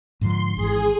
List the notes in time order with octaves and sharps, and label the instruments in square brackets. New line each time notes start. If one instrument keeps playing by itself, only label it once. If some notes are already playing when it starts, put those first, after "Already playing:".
[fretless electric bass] G#2 D3 F3 [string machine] C6
[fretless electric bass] G#1 G#2 E3 [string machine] G#4